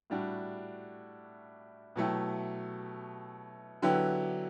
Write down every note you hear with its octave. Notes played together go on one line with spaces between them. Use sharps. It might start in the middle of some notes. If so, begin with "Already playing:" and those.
A2 G3 D4 F#4
B2 F#3 A3 E4 G4
D3 F#3 B3 E4 G4